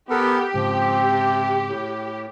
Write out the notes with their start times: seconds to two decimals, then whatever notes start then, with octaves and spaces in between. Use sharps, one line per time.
0.10 B3 G4 A4 A#4
0.54 G#2 C#3 F3 G#3 C4
1.09 C3
1.68 A2